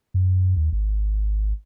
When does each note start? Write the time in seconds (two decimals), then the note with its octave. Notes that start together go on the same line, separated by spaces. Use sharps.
0.14 F#2
0.56 D#2
0.72 G#1